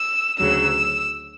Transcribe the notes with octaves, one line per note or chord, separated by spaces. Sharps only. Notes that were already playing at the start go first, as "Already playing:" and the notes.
Already playing: E6
D2 C#3 F#3 E6